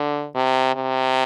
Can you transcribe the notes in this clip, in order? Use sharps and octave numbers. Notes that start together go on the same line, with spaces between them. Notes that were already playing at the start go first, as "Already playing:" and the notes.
Already playing: D3
C3
C3